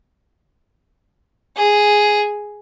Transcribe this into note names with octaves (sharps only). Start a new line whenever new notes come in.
G#4